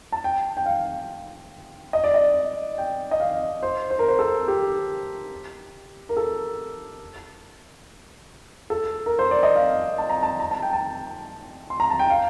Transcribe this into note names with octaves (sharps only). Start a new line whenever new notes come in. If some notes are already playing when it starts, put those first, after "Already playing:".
A5
G5
G5
F5
D#5
D5
D#5
G5
D#5
F5
C5
C5
A#4
C5
A4
G4
A#4
A4
A4
A#4
C5
D5
D#5
F5
A5
A#5
A5
A#5
A5
G5
A5
C6
A#5
A5
G5
F5